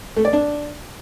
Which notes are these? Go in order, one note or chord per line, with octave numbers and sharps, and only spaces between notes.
A3
D5
D4